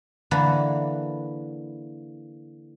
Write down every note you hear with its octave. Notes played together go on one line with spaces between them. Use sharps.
D3 E3 A#3 B4 A5